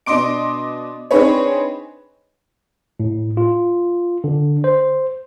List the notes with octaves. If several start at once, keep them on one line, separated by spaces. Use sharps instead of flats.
B2 D4 D#5 C6 D6 D7
C4 D4 D#4 G#4 B4 C#5
A2
F4
D3
C5